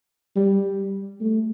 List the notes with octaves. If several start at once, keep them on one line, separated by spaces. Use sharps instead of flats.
G3
A3